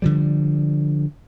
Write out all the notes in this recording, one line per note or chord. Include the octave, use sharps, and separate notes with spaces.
D3 F3 G3